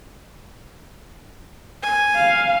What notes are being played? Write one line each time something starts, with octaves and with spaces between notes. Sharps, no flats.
G#5
F5